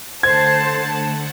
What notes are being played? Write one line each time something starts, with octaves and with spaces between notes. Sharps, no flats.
D3 A3 C5 F#5 A5 G#6